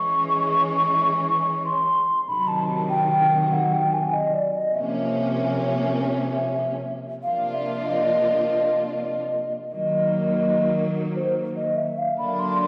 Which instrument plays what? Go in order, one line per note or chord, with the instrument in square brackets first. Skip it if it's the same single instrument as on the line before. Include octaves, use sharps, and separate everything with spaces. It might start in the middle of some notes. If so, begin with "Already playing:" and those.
Already playing: [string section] E3 G#3 C#4 [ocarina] C#6
[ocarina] C6
[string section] C3 D#3 F#3 [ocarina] B5
[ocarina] A5
G5
F#5
G5
G#5
D#5
D5
D#5
[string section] C3 F3 A#3 C#4 [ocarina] E5
[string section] C3 F3 A#3 D4 F4 [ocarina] F5
[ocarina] E5
D#5
[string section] D#3 F#3 A#3 [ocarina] D#5
[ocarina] C5
D#5
E5
F5
[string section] D3 F#3 A#3 D4 [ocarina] B5
[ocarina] C6